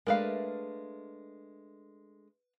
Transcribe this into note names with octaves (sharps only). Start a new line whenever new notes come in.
G#3 A3 D4 A#4 B4 F5